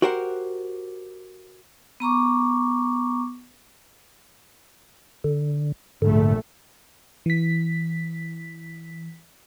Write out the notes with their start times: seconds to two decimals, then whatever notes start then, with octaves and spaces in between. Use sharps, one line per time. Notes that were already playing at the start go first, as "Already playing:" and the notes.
0.02 F#4 G4 A#4 C5 F#5
2.00 B3 A#5 C#6 D6
5.24 D3
6.02 A#1 G#2 D3 A3
7.26 E3 B6